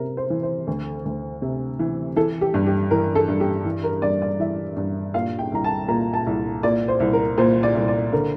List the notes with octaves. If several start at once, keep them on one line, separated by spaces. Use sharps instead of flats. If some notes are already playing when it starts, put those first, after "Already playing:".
Already playing: C3 A#4
C5
E3
C5
D2
D2
C3
E3
E3 A4
G4
G2
G4
E3 A#4
A4
G2
G4
E3
A#4
G2 D5
D5
E3 E5
G2
A#2 F5
G5
C2 A#5
A5
A#2 A#5
A5
C2
A#2 D5
C5
C2
A#4
A#2 C5
D5
C2
D5
D3 A#4